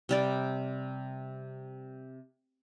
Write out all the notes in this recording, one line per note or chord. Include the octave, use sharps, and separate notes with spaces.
C3 G3 D5